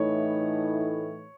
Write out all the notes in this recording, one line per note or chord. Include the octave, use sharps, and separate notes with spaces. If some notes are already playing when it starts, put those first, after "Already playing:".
Already playing: A2 E3 A3 D#4 C#5